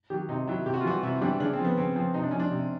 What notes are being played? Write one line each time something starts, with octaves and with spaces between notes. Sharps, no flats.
D#3 F#3 G4
C3 D#4
D#3 F#3 E4
C3 G4
F#4
F4
E3 G3 F#4
C3 E4
E3 G3 D4
C#3 D4
C4
F3
B3
C#3 C4
F3 C4
C3 D#4
D4
F3 C#4
D4
C3